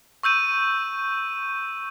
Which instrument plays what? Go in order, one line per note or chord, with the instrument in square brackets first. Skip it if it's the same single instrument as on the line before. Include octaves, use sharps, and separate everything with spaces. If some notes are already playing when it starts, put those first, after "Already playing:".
[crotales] C#6 E6 G6 D#7